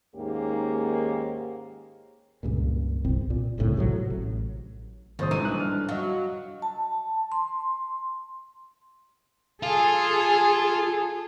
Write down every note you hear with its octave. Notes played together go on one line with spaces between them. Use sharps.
D#2 G#2 A#3 C#4 G4
C#2 G2 A#2
G1 C2 C4
A#2
G1 C2 A2 C#3
A2 C3 E3 F#3
A1
C2 A2 D#3 G3 C5 D#6
A#1 G#2 E3 A#5 D#7
G3 D4 F#6
F6
F#3 D#5 F5
A5
C6
F4 G#4 A4